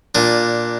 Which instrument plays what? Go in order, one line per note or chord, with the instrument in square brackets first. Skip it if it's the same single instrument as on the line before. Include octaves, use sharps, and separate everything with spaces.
[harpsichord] A#2 D4